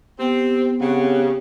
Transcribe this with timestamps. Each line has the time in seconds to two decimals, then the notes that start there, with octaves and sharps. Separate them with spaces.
0.20 B3 C4 G4
0.81 C#3 C4 G4 F#5